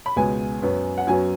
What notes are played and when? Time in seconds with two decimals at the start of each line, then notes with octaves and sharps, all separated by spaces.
0.06 B5
0.16 C#2 B2 G#3 B3 G#5
0.62 F#2 F#3 B3
0.98 F#5
1.07 F#2 F#3 B3 G#5